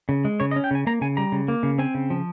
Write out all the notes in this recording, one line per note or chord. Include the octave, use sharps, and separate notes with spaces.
C#3
G#3
C#3 C#5
D#5
C#4
G5
C#3 G#5
A#3 A#5
C#3 G#5
G3 A#5
C#3
A#3
C#3
C4 G#5
C#3
F3